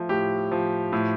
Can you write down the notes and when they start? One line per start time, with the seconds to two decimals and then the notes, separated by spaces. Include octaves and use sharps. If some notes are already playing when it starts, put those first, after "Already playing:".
Already playing: F3 A3
0.09 A2 G4
0.52 F3
0.93 A2